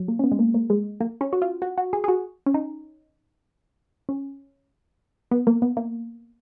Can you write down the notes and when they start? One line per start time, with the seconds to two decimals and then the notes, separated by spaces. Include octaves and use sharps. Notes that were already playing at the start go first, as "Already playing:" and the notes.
Already playing: F#3
0.08 A#3
0.19 C#4
0.24 B3
0.32 G#3
0.39 A#3
0.54 A#3
0.70 G#3
1.01 A#3
1.21 C#4
1.33 F#4
1.42 F4
1.62 F#4
1.78 F#4
1.93 G#4
2.04 G#4
2.08 F#4
2.46 C#4
2.54 D#4
4.09 C#4
5.31 B3
5.47 A#3
5.62 B3
5.77 A#3